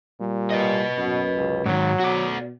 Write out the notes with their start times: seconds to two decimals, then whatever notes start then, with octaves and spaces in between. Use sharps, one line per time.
0.20 A#2 G3
0.50 B4 D#5
0.98 F#2 B2
1.34 C#2
1.66 G#2 D#3 F#3
2.00 B2 F#4 D5